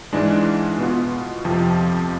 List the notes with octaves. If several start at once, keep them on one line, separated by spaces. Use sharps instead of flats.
G#2 E3 G#3 D4
B2 B3 F4
F2 C3 F3